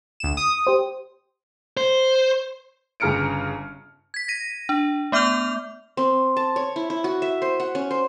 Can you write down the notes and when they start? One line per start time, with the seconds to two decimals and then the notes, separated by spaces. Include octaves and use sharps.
0.20 D2 E7
0.37 D#6
0.67 G4 C5
1.77 C5
3.00 G1 C#3 A#5 F6 C#7 D7
4.14 G#6 B6
4.28 A#6 D#7
4.69 D4
5.12 A3 B3 D6 F6 G6 F7
5.97 C4
6.37 A5
6.56 C#5
6.76 E4
6.90 E4
7.04 F#4
7.22 E5
7.42 C5
7.60 F#5
7.75 C#4
7.91 C5